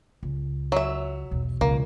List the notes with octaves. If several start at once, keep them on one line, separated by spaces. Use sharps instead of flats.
C#2
F#3 E5
B1 E2
C#2 A#3